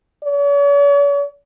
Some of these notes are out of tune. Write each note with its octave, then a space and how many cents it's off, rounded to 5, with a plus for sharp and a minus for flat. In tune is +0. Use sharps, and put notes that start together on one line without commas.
C#5 +45